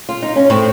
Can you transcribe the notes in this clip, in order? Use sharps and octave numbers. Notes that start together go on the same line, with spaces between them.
F4
D#4
C#4
A2 A3 C4